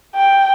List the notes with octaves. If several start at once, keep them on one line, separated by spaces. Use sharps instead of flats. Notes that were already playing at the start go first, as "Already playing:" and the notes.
G5